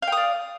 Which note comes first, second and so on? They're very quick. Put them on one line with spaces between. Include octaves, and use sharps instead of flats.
F5 G5 D#6 D5